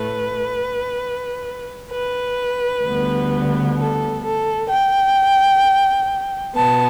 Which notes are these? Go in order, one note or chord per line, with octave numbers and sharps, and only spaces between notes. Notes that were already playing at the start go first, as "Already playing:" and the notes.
Already playing: A2 A3 B4
B4
D2 D3 G3 B3
A4
A4
G5
B2 B3 A5